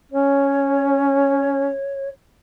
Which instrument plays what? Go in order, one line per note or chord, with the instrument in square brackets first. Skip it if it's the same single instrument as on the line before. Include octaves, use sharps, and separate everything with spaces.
[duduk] C#4 [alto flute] C#5